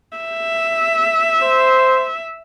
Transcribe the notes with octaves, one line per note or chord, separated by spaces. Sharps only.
E5
C5